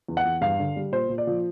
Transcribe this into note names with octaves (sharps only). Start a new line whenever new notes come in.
E2
F#5
E2
G2 F5
D3
G3
A#2 C5
A#2
D5
F3